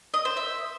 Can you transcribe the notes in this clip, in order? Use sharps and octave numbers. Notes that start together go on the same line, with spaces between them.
D#5
C5
E5